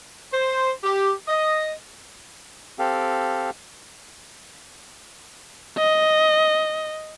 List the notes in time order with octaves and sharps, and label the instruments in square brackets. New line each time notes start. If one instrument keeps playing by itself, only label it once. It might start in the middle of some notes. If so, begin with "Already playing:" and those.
[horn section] C5
G4
D#5
[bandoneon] C4 G4 A4 F5
[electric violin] D#5